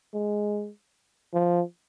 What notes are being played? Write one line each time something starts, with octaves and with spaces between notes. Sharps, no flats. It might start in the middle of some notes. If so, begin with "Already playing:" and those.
G#3
F3